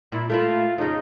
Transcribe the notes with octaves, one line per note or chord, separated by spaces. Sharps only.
A#2 E4
A3 A#3 E4 F4
F2 C#3 D#4